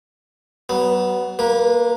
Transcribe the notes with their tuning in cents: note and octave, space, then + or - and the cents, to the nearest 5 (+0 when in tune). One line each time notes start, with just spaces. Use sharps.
F#3 +40 B3 +0
A#3 +0 B4 -30